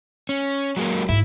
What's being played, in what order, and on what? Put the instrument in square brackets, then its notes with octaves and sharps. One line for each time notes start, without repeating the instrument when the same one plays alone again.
[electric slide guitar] C#4
F#3 G#3 A#3
[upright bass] G#2 A#3 [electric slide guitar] E4